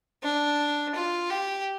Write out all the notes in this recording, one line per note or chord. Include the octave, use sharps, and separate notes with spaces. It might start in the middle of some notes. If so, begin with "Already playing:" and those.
D4
F4
G4